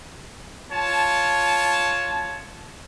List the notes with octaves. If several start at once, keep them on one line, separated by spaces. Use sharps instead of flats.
F4 C#5 A5